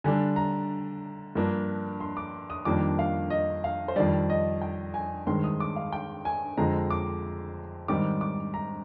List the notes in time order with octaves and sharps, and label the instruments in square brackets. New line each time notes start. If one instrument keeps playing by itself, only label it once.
[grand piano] D3 G3 D4 G#5
A#5
G2 F3 A#3 D4
C6
D6
D#6
F2 D#3 G3 A#3 D4 D6
F5
D#5
F5
C5
F2 D#3 G3 D5
D#5
G5
G#5
G2 D#3 G#3 C4 C6
D#6
D6
F5
G5
G#5
F2 D3 G#3 C4 A#5
D6
G#2 D#3 G3 C4 D6
D6
A#5